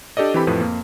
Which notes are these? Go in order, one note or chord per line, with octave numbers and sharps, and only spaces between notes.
D4 G4 A4 D5 D#5
E3 C4 G4 A4 B5
F2 A2 F3 B4
F2 A#3